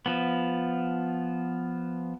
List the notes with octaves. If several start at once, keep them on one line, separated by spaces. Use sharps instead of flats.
F3 B3